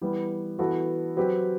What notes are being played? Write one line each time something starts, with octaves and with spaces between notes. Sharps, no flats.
E3 G3 B3
E3 B3 F#4 A4
F#3 C4 G4 B4